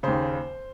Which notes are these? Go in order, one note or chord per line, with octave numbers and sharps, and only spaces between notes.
D#2 C#3 C5